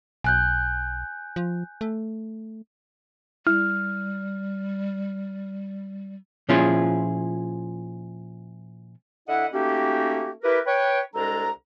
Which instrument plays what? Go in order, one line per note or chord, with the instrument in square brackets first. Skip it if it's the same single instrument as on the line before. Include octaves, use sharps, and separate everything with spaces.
[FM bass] B1 [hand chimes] G#5 F#6 G6
[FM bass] F3
A3
[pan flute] G3 [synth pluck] E4 [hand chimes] F6
[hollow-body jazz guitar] A#2 F3 C#4 E4 F4 G#4
[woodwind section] D3 E4 D#5 E5 F#5
A3 A#3 C#4 D#4 F#4 G4
E4 G4 A#4 B4
B4 C#5 G5
C2 G#3 D4 A4 A#5